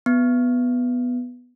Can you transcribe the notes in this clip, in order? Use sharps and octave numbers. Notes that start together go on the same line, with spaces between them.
B3